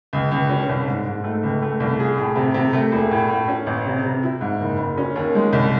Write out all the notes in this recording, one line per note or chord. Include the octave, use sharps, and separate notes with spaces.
C#2
C#2
C#4
C2
G#2
G#2
A3
C#2
A3
C2
G#4
A2
C3
C3
A3
E1
A2
A2
C#4
A1
C3
C3
E4
G#2
F#1
F#1
C#4
D#2
G#3
C2